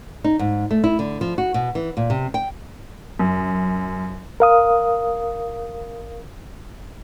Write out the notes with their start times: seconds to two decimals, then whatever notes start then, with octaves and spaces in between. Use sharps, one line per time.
0.24 D#4
0.39 G#2
0.71 A3
0.84 E4
0.99 D3
1.21 F3
1.38 F#4
1.54 B2
1.75 E3
1.97 A#2
2.10 C3
2.34 G5
3.19 F#2
4.40 A#4 F5 D#6